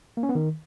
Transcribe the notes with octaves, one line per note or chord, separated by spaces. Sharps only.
A#3
C#4
B3
D#3